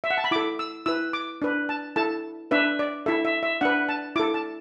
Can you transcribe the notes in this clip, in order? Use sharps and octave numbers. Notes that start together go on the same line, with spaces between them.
E5
F#5
A5
B5
E4 A4 D6
E6
E4 B4 E6
D6
D4 B4
A5
E4 A4 A5
D4 B4 E5
D5
E4 A4 E5
E5
E5
D4 B4 F#5
A5
E4 A4 D6
A5